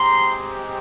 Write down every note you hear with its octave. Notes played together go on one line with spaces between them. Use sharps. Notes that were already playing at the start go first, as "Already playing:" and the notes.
Already playing: G#3 C4 D#4 G4 A#5 C6